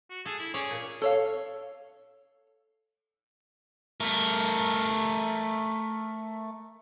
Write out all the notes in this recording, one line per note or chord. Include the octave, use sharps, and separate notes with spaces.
F#4
G#4 A4
E4
C#4 G#4 C#5 D5
A#2
A4 C#5 F5
A3 A#4